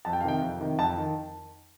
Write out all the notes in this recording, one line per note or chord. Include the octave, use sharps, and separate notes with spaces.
F2 A5
G5
F5
C3 D#3 G5
F2
C3 D#3
F2 A5
D#3